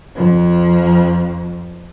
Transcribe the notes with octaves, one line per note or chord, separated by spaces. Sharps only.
F2 F3